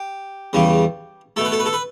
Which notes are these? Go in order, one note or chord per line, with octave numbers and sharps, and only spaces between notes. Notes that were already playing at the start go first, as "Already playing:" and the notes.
Already playing: G4
E2 C#3 G3
B2 A3 A4
B4
A4
B4
A4
B4